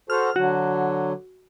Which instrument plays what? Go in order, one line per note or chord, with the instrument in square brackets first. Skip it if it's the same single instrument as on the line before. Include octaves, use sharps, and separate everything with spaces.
[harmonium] F#4 A4 C5 [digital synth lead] F6
[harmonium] D3 F#3 [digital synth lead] F#4